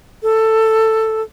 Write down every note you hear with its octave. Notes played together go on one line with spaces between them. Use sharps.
A4